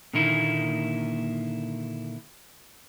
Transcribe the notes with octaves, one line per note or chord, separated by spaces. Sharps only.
A#2 D3 D#3 A#3 D#4 E4